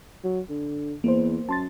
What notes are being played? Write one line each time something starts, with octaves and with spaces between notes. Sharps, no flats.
F#3
D3
E2 A#3 C5
F#2 A5 C6 A6